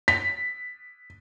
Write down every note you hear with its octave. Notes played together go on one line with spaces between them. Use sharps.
B6